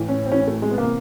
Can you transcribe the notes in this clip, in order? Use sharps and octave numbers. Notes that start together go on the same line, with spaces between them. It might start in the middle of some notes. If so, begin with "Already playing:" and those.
Already playing: A2 E3
C#4
C4
A2 E3 C#4
A3
G#3
B3
C3 E3 A#3